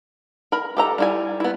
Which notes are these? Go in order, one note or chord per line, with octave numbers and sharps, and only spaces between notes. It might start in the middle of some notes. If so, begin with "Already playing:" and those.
A#4 B5
G4 A4 A#5
G3 E4 G#5
B3 E4